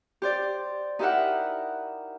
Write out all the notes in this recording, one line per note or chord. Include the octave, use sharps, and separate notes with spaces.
G4 C5 D5
D#4 E4 G4 A#4 E5 F#5